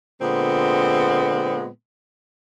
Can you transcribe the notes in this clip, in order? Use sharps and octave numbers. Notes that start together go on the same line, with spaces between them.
A#2 D3 G#3 B3 C4